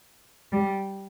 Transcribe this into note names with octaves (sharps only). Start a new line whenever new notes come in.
G3